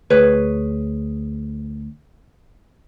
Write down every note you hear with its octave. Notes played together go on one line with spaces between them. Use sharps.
D2 G#4 B4 C#5